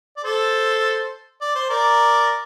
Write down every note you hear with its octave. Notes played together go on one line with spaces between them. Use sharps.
D5
A4 C5
D5
C5
A#4 D5